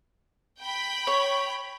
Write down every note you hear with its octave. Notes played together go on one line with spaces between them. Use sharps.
G5 B5
C#5